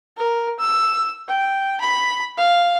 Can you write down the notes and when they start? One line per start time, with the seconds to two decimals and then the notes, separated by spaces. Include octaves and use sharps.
0.17 A#4
0.59 E6
1.28 G5
1.81 B5
2.38 F5